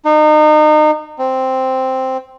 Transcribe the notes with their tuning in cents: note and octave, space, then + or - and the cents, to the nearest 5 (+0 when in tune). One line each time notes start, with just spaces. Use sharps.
D#4 -30
C4 +0